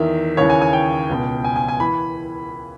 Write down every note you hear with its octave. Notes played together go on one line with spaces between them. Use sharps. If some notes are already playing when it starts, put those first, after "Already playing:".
Already playing: E2 D#3 E5
D#2 C#3 E3 C#5
G#5
G#5
G5
C#2 B2
G#5
G#5
G#5
E3 B5